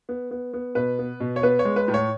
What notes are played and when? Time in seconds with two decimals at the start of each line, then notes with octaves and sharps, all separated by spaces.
0.09 B3
0.31 B3
0.54 B3
0.75 B2 B4
0.99 B3
1.20 B2
1.36 C#5
1.43 B3 B4
1.59 C#5
1.65 G#3
1.76 B4
1.88 A2
1.94 C#5